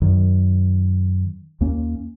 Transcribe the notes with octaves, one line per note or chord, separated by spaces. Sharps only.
F#2 D#3
D#2 A#3 C#4